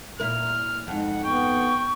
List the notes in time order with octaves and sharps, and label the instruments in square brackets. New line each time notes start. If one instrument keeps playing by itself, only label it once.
[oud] A#2 E4 A#4 [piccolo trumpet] F6
[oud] F2 G#2 [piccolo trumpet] F#5
[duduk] B3 [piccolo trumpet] G5 [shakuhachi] C#6